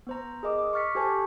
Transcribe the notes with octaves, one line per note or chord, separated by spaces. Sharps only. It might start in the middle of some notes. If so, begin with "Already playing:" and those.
B3 C5 A#5
G#4 A#4 D#5 D6
D6
C#6 D6 F6 A6 B6 C#7
G4 A4 C5 G#5 A5 C#6